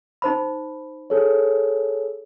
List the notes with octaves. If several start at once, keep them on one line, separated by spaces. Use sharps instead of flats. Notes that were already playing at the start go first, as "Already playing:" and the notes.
D#4 C5 B5
G#4 A4 C#5